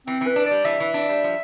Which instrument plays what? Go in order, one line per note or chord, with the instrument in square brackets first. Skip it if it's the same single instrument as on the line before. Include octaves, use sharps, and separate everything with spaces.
[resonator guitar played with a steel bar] E3 [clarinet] C4
[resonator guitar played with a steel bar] E3
[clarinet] B4
[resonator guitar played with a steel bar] D4
[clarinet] D5
[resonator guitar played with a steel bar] G3
[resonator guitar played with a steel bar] E3 [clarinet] E5
[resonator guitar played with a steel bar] E3
D4
G3
F3